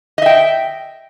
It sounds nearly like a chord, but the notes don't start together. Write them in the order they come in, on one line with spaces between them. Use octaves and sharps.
D#5 E5 G5